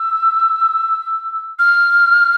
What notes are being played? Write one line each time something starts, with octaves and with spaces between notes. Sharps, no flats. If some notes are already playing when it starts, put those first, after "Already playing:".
Already playing: E6
F6